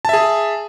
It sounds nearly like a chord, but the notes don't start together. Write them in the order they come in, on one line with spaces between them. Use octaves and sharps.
A5 E5 G#4